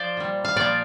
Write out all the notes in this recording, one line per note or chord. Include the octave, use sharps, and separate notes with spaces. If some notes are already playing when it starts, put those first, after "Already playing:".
Already playing: F3 C5 D5 F5
A#2 G3
F5
A#2 F3 D5